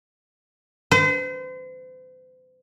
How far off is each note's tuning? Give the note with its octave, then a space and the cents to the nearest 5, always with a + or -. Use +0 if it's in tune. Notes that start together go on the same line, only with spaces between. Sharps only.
C5 -40